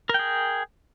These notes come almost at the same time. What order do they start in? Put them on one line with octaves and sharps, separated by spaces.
A#4 G5 G#4